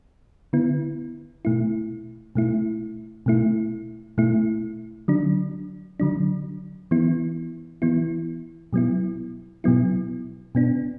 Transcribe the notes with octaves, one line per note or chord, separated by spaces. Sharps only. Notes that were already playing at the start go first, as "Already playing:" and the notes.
D3 B3 E4
B2 A3 E4
B2 A3 E4
B2 A3 E4
B2 A3 E4
D3 F#3 D4
D3 F#3 D4
E3 B3 E4
E3 B3 E4
B2 F#3 B3 E4
B2 F#3 B3 E4
B2 B3 D4